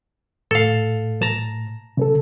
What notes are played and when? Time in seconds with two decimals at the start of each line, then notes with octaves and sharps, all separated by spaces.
0.51 A2 A4 F5
1.22 A5 A#5
1.97 C#3 A4